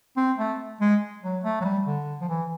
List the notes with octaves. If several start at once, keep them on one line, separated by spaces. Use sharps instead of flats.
C4
A3
G#3
F#3
A3
F#3
G3
D3
F3
E3